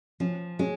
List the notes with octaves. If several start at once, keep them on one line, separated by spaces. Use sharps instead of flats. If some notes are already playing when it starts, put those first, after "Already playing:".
F3 C#4
G#3 C#4